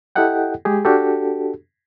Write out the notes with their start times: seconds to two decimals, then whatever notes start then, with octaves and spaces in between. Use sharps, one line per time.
0.16 E4 G4 A4 D#5 F#5 G5
0.65 G#3 G4 G#4
0.85 D4 F#4 G4 A4